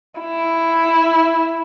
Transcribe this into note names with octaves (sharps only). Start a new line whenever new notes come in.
E4